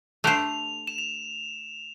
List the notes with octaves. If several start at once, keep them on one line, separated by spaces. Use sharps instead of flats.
A3 D4 G4 C5 F7
E7
F7